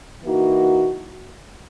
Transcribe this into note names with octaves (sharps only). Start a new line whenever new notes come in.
E3 A#3 D#4 F#4